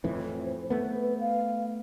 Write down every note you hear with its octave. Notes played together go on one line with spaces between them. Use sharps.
F2 A2 E3
C5
A3 B3 B4
B4
F5